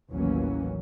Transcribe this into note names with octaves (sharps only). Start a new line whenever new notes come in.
A1 D#2 E3 F#3 A#3 C#4